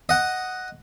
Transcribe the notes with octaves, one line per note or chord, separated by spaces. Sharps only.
D#5 F#5